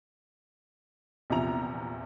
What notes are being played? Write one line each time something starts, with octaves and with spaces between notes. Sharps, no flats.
A#1 E2 C3 F3 A#5 F7